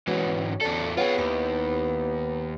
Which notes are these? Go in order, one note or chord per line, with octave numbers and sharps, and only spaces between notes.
G#2 E3 B3 C#4 F#4
E2 D3 A4
B3 F4 G#4 C#5 F#5 G5
D#2 E4 G4 C5